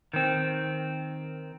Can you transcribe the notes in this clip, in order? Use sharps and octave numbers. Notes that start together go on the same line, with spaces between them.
D#3 C4